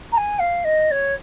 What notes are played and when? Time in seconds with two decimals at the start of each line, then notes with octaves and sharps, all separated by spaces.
0.12 A#5
0.17 G#5
0.39 F5
0.64 D#5
0.91 C#5